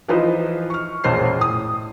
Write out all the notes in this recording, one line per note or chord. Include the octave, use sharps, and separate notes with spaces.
E3 F3 D#4 B4 C5 D#5
C#6 F6
E1 A#1 C#4 C5 F6 C7
A2 D#6